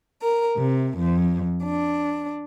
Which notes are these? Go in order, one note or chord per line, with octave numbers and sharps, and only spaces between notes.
A#4
C3
F2
D4